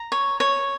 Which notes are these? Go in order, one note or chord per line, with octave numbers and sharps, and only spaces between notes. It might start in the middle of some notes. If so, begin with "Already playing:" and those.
Already playing: A#5
C#5
C#5